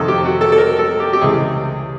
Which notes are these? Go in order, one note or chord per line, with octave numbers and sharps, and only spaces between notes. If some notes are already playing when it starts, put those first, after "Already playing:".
Already playing: F2 C3 D#3 A4
G4
F#4
A4
A4
A#4
A4
G4
G4
C#2 C3 E3 G#4